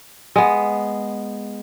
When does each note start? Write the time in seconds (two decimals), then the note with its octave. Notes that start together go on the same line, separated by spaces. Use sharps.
0.36 G#3 B3